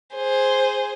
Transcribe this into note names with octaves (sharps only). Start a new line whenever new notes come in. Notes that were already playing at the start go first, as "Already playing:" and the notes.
G#4 C5